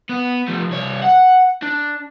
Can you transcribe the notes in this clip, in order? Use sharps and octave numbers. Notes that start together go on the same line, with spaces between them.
B3
F3 A3
C2 C#5
F#5
D4